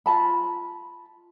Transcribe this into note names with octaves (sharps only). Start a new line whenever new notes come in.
F4 A5 B5